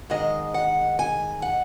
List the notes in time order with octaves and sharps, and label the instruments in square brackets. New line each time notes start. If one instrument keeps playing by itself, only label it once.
[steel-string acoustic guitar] G#2 D#3 G#3 D#5
F#5
G#5
F#5